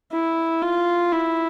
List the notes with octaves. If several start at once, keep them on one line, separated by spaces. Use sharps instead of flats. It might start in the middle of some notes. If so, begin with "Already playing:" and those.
E4
F4
E4